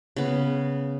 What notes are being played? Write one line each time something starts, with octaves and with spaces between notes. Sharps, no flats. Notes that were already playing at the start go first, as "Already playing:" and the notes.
C#3 B3